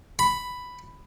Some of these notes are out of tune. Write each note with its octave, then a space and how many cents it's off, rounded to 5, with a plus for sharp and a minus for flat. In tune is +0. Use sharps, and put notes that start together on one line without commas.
B5 +5